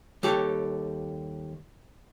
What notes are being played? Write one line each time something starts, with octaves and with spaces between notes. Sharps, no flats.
D#2 G3 G4 A4 C#5